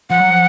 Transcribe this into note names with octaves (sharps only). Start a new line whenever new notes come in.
F3 F#5
F#3
F3